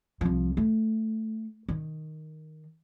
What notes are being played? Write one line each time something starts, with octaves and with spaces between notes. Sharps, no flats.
C2 F3
A3
D#3